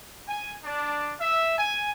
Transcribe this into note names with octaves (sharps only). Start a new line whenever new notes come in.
G#5
D4
E5
G#5